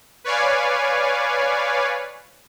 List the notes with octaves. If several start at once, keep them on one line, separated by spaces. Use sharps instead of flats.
B4 C#5 D5 F5 G#5